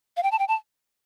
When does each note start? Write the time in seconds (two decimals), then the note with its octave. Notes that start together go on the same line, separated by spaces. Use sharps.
0.17 F5
0.23 G5
0.32 A5
0.39 G5
0.48 A5